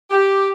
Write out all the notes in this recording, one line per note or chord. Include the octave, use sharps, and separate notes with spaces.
G4